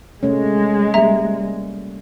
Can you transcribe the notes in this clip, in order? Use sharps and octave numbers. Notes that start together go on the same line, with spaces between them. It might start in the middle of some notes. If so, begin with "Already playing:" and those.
C3 G#3 A3 C#4
G3 A#3 E5 A#5